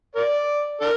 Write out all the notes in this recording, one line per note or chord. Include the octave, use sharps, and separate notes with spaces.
A#4 D5
D4 A#4